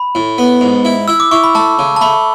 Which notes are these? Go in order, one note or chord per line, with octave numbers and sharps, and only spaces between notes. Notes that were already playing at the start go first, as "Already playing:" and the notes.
Already playing: B5
A2
B3
G#2
E4
E4 E6
D6
E4 C#6
B5
A3 A5
C#3
A5
A3 B5